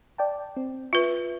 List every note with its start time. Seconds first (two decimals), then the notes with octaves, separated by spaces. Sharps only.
0.18 D5 G5 A5
0.57 C4
0.93 F4 B4 E5